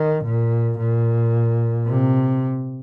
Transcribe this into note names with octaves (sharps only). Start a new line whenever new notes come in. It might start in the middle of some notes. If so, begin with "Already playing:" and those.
Already playing: D#3
A#2
A#2
C3